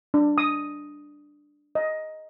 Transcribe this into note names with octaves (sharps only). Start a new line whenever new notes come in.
D4
D#6
D#5